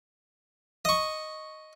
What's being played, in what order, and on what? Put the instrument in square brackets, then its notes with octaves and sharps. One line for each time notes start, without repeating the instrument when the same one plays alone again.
[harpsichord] D#5 C#6